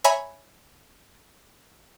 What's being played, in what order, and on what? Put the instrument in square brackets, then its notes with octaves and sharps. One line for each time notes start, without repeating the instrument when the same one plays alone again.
[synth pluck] C#5 E5 G#5 A#5 B5